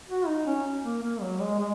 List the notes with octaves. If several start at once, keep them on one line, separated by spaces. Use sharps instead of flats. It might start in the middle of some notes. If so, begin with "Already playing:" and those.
F#4
D#4
C#4
A#3
A#3
F#3
G#3
G#3